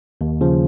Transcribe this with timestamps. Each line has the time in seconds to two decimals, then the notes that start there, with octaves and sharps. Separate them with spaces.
0.21 D#2
0.41 C#3 F3